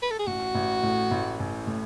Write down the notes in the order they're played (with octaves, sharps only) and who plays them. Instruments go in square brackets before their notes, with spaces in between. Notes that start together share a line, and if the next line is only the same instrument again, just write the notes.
[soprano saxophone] B4
A4
G#4
[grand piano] A1 [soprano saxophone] F#4
[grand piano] A1
A2
A1
A1
A2